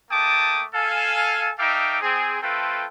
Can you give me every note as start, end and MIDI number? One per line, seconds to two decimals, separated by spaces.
0.11 0.64 57
0.11 0.64 58
0.11 0.64 79
0.11 0.64 81
0.11 0.64 86
0.11 0.64 87
0.74 1.50 69
0.74 1.50 77
0.74 1.50 80
1.59 1.99 63
1.59 1.99 69
1.59 1.99 76
1.59 1.99 77
1.59 1.99 79
1.59 1.99 86
2.01 2.39 60
2.01 2.39 68
2.42 2.86 57
2.42 2.86 60
2.42 2.86 65
2.42 2.86 69
2.42 2.86 71
2.42 2.86 79